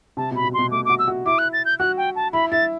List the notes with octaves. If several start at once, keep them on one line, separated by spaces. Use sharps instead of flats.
C3 A5
B2
B5
B2
B2 C6
A3 D6
F#4 D6
E6
F#4
E4 D6
F#6
A6
G6
F#4 F#6
G5
A5
E4 B5
E4 A6